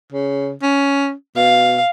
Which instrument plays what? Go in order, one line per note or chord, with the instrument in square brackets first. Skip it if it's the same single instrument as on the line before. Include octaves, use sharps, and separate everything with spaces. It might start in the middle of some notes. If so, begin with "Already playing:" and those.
[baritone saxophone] C#3
C#4
[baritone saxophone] B2 [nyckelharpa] F5